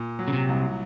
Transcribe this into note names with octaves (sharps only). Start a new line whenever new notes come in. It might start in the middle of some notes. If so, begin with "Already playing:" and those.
Already playing: A#2
F#3
C#3
C3
C2